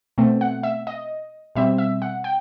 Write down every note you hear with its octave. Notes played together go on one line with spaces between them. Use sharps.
B2 A3 C4
F#5
E5
D#5
B2 G3 C4 E5
E5
F#5
G5